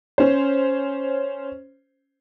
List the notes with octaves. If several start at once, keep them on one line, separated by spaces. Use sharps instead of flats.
C#4 C5